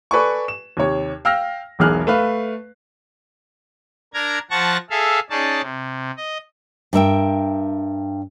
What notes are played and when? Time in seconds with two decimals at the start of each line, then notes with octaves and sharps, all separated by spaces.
0.11 A4 B4 D5 G#5 C#6
0.48 E7
0.77 D#2 C3 C#5
1.25 F5 G5 E6 F6 A#6
1.79 E1 B1 E2 G#4 F6 F#6
2.07 A3 B4 F5
4.14 D4 A#4 A#5 G#6
4.51 F3 F#5 A5 C#6 A#6
4.90 G#4 A4 E5 F5
5.30 C#4 D#4 G#4 D5 A5
5.62 C3
6.17 D#5
6.93 G2 A#4 E5 G5